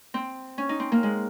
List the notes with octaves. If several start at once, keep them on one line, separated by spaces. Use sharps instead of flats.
C4
C#4
D#4
C4
A#3
G#3